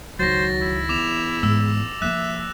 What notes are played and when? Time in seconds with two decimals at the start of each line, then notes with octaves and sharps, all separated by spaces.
0.19 C#2 D#3 F#3 C5 A6 A#6
0.61 E4
0.89 E2 D6 E7 F7
1.43 G#2 E6
2.02 F3 A#3 E5 F#6